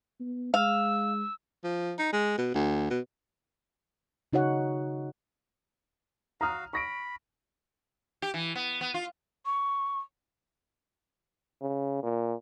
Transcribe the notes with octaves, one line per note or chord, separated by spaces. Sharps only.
B3
G#3 F5 E6
F3
D#4
G#3
B2
D2
B2
C#3 D#4 F#4 C#5 F#5
F#4 F5 A#5 D#6 F6
B5 C#6 A#6 D7
G4
E3
B3
B3
F4
C#6
C#3
A#2